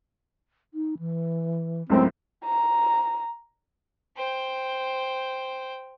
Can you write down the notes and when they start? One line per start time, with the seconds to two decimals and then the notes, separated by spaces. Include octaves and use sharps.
0.74 D#4
0.99 E3
1.90 C#2 F#2 A2 C4
2.45 A#5
4.17 C5 G5